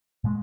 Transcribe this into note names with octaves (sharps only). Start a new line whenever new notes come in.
A#2 G#3